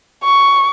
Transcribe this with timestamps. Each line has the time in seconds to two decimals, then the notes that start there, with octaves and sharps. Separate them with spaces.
0.24 C#6